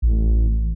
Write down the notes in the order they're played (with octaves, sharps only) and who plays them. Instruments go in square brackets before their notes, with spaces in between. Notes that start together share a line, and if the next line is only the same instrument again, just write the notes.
[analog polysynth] A1